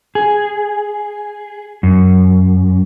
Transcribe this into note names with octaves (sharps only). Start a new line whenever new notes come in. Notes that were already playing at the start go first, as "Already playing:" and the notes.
G#4
F#2